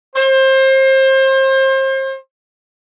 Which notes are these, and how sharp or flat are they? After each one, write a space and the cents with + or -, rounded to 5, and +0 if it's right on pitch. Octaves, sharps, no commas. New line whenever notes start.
C5 +30